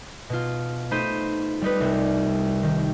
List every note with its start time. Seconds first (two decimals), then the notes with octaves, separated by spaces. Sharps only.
0.30 B2 F4
0.91 A3 D#4 C5 B5 G6 D#7
1.61 G3 D#4 B4
1.80 C2
2.63 D#3